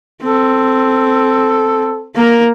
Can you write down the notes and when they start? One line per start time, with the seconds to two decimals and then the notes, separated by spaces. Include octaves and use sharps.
0.23 C4 A4
2.15 A#3 A#4